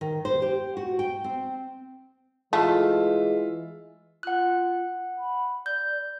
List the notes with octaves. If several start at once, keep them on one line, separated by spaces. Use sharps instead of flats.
D#3
C5
G4
F#4
G5
C4
E3 G#3 A3 F4 E5
F4 F#5 F#6
B5
D5 G6